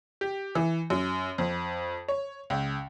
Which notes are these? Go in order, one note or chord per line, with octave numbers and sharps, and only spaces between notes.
G4
E3
F#2
F2
C#5
C#2